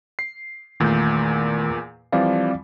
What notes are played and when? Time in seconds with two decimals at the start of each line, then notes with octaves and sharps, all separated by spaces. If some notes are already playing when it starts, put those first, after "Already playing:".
0.19 C7
0.80 E2 A#2 D#3 A3 G6
2.12 E3 F3 G3 C4 D5 F5